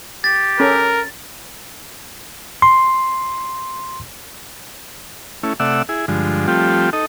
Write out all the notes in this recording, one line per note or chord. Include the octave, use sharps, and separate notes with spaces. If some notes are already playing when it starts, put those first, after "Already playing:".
G4 A6
C#4 A4 A#4
C6
A3 C#4 E4
C3 A3 D5 E5 F#5 E6
E4 G#4
G2 D3 F3 G#3
F3 G3 A3 C4 F4 G4
D#4 A4 D#5